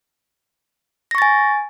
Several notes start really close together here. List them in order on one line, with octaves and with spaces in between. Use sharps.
A#6 C#6 A6 G#5